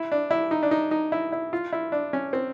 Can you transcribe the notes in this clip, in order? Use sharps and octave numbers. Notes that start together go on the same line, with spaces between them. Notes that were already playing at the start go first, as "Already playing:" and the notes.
Already playing: E4
D4
E4
D#4
D4
D#4
D#4
E4
E4
F4
E4
D4
C#4
C4